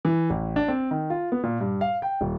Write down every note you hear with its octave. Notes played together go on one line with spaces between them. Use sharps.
E3
A1
D4
C4
D#3
F4
B3
A#2
G2
F5
G5
D#1